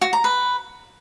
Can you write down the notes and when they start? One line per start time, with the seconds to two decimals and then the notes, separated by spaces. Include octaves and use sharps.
0.01 F#4
0.13 A#5
0.24 B4